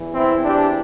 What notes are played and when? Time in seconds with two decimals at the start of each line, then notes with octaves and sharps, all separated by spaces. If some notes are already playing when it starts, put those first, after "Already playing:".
Already playing: E2 E3
0.13 C4 E4
0.44 D4 G4